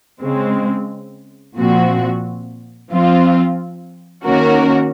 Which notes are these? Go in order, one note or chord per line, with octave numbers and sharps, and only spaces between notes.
C#3 G#3 C4
A#2 F3 C4 F#4
F3 C4 F4
D#3 A#3 C#4 F#4 A#4